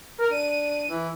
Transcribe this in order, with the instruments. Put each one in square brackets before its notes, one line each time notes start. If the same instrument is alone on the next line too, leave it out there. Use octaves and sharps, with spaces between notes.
[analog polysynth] A#4
[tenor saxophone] D4 [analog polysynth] D#7
[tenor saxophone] E3